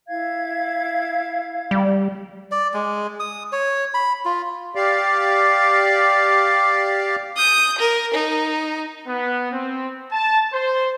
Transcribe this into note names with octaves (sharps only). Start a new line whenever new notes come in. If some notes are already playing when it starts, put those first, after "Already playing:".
E4 F5 G#6
G3
D5
G#3
D#6
C#5
B5
F4
G4 D5 F5
D#6 G6
A#4
D#4
B3
C4
A5
C5